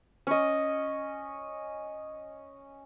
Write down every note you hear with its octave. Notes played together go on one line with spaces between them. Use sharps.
C#4 D#5